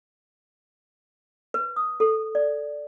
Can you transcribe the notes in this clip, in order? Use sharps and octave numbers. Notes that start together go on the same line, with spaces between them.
B4
D#6
A4
D5